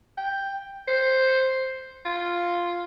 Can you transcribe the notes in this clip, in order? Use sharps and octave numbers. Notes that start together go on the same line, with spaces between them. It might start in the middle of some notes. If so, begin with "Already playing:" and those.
G5
C5
F4